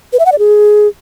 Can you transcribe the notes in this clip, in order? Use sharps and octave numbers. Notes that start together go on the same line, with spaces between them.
B4
E5
F#5
D5
G#4